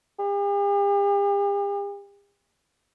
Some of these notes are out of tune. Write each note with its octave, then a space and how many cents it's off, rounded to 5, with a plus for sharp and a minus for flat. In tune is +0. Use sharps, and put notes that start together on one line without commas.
G4 +45